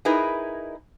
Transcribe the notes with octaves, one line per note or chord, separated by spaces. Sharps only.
D#4 E4 G#4 A#4 B4